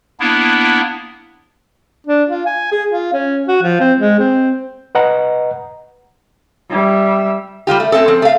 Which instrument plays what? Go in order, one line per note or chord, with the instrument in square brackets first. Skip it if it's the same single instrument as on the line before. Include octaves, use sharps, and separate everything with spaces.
[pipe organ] A#3 B3 D4 E4
[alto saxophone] D4
F4
G#5
G#4
F4
C#4
F#4
F3
C4
G#3
C4
[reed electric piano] B4 D#5 F#5 A#5
[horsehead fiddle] G3 E5
[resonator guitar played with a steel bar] G3 G#3 F4 G4
A3
A3 C4 C#4 A4
F3 C4
A3 F5